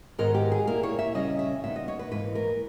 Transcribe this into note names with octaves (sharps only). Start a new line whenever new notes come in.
G#2 D#3 G#3 B3 A#4
G4
G#4
A#2 A#3 E4 A#4
C#5
E5
C#3 G3 C#4 E4 D#5
E5
A#2 G3 B3 D#4 E5
D#5
C#5
B4
G#2 E3 A#3 D#4 B4
A#4